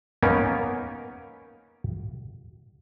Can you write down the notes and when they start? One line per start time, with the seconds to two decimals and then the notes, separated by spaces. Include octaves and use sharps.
0.23 A#3 B3 C#4 D#4 A#4